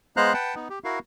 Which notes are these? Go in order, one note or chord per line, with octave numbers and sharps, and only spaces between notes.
G#3 B3 C5 F5 A#5 F#6
B4 F#5 G5 A5
B3 D#4
G4
E4 F#4 A#4 F5